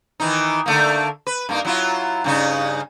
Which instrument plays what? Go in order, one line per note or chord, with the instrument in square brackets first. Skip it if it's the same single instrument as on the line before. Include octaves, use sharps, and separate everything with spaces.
[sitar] D#3 E3 D#4
D3 A3 A#3
B4
G2 A#3 D#4
F#3 E4 F4
G2 C#3 D#4